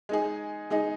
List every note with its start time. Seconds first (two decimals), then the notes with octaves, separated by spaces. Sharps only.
0.09 G#3 D#4 G#4
0.70 G#3 D#4 G#4